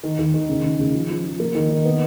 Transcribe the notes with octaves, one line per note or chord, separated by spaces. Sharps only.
D#3
D#3
D#3
C#3
C#3
C#3
F3
F3
F3
A#3
D#3
D#4
B3